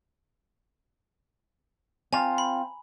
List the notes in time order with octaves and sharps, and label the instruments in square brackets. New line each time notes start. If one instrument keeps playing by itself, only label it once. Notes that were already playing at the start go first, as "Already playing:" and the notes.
[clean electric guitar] C4 F4 [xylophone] G#5 A#5
[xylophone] B5